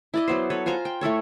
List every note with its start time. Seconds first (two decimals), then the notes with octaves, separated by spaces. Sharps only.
0.14 E4 D5 D#5
0.28 F#3 B3 C5
0.50 A4 B4 C#5
0.66 F4 C5 G#5 A#5
0.85 G5
1.01 A3 E4 A4 C#5